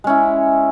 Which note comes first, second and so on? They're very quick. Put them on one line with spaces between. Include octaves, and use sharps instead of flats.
G#3 C#4 E4